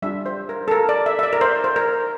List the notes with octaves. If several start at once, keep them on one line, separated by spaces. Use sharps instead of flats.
G3 D4 F4 E5
C5
A#4
A4
A#4
D5
E5
E5
D5
A#4
C5
C5
A#4